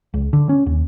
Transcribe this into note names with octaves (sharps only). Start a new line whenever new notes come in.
C#2
D3
C#4
D#2